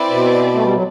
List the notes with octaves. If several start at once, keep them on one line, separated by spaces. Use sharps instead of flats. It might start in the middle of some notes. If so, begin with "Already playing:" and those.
Already playing: C4 E4 B4 D5
B2
A3
G3
F#3